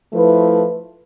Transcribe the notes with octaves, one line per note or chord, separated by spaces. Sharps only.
F3 A3 E4 B4